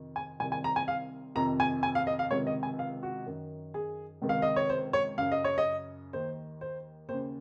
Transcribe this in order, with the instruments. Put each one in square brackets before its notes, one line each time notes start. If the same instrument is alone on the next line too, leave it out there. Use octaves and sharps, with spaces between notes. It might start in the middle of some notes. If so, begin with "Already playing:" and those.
Already playing: [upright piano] F2 C3 D#3
G#5
C2 C3 D#3 G#5
G#5
A#5
G#5
F5
F2 C3 D#3 A#5
G#5
G#5
F5
D#5
F5
C#2 C3 D#3 C#5
D#5
G#5
F5
F#4
F#2 D#3
G#4
C#2 C3 D#3
F5
D#5
C#5
C5
C#5
F#2 C#3 F5
D#5
C#5
D#5
D#2 D#3 C5
C5
D#2 C5
C#3